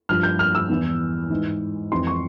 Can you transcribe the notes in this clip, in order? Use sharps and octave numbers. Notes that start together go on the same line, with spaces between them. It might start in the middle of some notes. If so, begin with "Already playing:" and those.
G2 F3 F6
G6
F6
E6
E2 E3
G#2 E3
F2 E3 C6
C#6